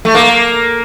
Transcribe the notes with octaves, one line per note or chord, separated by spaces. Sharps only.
A3
A#3